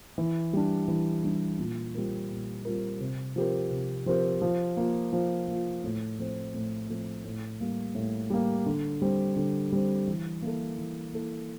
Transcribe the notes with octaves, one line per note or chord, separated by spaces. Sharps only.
E3
G3 D4
E3
G3 D4
A#2
G3 C4 F4 A#4
A#2
G3 C4 F4 A#4
C3
F3 C4 G4 A#4
C3
F3 C4 G4 A#4
F3
A#3 F4
F3
A#3 F4
A2
F3 A3 C4
A2
F3 A3 C4
A2
G3 A#3
A2
G3 A#3
D3
G3 C4
D3
G3 C4
E3
A#3 E4 A4
E3
A#3 E4 A4